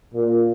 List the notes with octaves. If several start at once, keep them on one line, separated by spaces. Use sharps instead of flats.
A#2